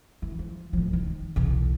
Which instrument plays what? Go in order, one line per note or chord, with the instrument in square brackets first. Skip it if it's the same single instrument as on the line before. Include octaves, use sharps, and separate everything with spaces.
[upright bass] E3
F3
A2 F3
D#3
B1 E2